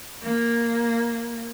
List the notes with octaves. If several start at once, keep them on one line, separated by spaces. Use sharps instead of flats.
A#3